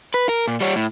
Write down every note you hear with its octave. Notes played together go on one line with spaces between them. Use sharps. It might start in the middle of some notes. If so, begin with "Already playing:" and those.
B4
A#4
A#2
G3 C#5
A2